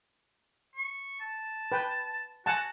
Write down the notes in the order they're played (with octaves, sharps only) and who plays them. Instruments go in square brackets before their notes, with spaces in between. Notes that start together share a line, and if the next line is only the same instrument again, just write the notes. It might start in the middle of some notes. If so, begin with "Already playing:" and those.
[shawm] C#6
A5
[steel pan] B4 G5
[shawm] F#4 [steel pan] F#5 G#5 A5